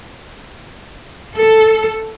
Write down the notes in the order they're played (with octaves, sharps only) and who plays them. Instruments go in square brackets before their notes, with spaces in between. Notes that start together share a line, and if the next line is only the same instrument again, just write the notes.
[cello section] A4